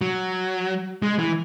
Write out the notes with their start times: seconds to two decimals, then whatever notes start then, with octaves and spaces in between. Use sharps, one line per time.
0.01 F#3
1.02 G#3
1.19 E3